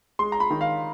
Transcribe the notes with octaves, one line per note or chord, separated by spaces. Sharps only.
G#3 C6
A#5
B5
D#3
F5